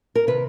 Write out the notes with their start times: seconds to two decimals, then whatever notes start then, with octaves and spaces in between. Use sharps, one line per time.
0.15 A#4
0.27 C3 D#3 B4